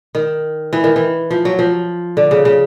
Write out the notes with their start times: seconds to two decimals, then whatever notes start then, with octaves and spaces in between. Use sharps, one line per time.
0.15 D#3
0.73 E3
0.84 D#3
0.96 E3
1.31 F3
1.45 F#3
1.59 F3
2.17 D3
2.31 C#3
2.45 C#3